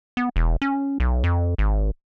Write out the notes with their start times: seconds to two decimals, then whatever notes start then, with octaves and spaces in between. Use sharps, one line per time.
0.17 B3
0.36 E1
0.62 C#4
1.00 B1
1.24 F2
1.58 G#1